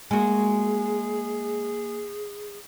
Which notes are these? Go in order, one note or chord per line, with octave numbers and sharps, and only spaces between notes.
G#3 A#3 F#4 G#4 G#5